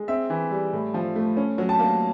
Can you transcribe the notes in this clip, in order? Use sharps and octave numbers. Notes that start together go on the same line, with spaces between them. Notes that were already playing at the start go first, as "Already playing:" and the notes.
Already playing: G#3
C4 E5
E3
G3
A2
F3
A3
C#4
F#3
A5
A#3